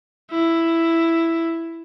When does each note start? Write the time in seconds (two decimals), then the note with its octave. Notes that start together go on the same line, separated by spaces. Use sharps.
0.31 E4